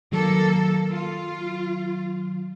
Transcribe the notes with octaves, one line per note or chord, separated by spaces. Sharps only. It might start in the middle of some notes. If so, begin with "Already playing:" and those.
D#3 F#3 A#3 A4
F4